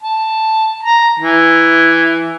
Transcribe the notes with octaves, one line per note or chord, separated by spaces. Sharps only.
A5
A#5
E3